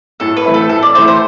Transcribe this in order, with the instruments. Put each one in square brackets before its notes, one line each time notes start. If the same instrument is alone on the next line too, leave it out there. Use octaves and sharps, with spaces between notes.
[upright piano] A2 [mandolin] A4
[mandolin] B4
[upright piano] E3 A3 C4 E4
[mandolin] A4
[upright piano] A2 [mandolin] A4
[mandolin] D5
[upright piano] E3 A3 C4 E4 [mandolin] C5
[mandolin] C5